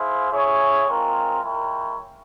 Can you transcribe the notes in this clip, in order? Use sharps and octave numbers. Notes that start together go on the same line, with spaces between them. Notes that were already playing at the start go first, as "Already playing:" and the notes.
Already playing: E4 G#4 C5 F5
E4 G#4 C#5
G#3 C4 F4 A#4
G#3 E4 A#4 C#5 G5